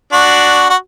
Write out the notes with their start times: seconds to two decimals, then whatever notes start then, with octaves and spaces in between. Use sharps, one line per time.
0.13 D4 F#4
0.70 F#4